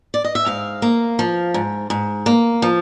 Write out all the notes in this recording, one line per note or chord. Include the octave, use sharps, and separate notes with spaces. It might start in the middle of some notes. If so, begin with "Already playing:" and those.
D5
D#5
E5
G#2 F5
A#3
F3
G#2
G#2
A#3
F3